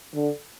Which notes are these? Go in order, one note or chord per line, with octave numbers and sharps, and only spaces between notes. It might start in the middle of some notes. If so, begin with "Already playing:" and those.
D3